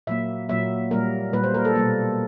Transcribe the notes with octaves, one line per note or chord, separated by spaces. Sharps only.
A#2 F#3 A#3 E5
A#2 F#3 A#3 E5
A#2 G3 A#3 A#4
A#2 G3 A#3 B4
C5
A#4
A4
B2 G3 A#3